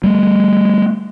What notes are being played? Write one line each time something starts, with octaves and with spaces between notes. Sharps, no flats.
G3 A3